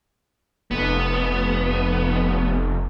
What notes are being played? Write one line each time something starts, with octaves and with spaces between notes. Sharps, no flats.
F1 B3